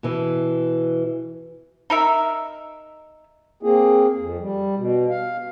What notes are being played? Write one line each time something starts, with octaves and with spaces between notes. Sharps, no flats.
B2 E3
D#4 A#4 E5
A#3 C4 G#4
F2
G3
B2
F5